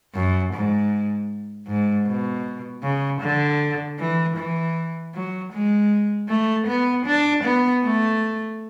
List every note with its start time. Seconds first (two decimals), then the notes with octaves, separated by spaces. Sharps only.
0.15 F#2
0.53 G#2
1.67 G#2
2.07 B2
2.83 C#3
3.21 D3
3.99 E3
4.37 E3
5.14 F#3
5.53 G#3
6.29 A3
6.67 B3
7.06 D4
7.44 B3
7.83 A3